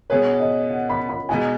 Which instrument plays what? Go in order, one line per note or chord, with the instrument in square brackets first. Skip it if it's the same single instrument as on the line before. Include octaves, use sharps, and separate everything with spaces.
[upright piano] B2 B3 G#4 B4 [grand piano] C#5
[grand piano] D#5
F#5
B5
B5
[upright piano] B2 G#3 B3 D#4 F#4 [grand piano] G#5